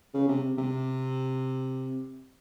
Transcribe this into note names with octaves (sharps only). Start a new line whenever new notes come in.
C#3
C3
C3